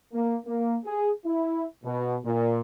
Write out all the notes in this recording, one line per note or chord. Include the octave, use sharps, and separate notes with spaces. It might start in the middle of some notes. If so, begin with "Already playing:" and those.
A#3
A#3
G#4
E4
B2
A#2